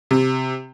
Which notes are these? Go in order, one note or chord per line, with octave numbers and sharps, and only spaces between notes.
C3